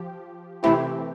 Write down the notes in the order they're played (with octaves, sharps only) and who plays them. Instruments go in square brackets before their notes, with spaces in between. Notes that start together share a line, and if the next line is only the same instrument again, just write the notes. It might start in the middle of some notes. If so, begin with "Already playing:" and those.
Already playing: [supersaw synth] F3 G4
[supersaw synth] C3 E3 A3 C4 G4 [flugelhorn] E4